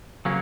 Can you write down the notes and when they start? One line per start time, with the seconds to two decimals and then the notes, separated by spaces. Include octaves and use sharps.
0.25 C#3 F#3 A#3 C#4